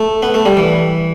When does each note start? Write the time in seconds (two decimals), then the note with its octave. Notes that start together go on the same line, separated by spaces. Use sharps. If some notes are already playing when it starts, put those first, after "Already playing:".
Already playing: A3
0.23 B3
0.34 A3
0.45 G3
0.57 E3